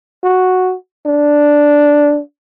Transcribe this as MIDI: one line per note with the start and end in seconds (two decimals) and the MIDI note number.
0.24 0.75 66
1.06 2.20 62